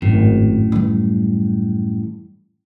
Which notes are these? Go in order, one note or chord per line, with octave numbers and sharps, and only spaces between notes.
G#1 F#2 A2
E3 G3